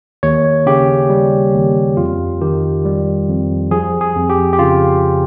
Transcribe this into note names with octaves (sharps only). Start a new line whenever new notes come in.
D#2 C#5
C#3 G4
G3
D#2
F2 F4
D#3 G4
G3
F2
F3 G#4
G#4
F2
G4
G4
C#3 F4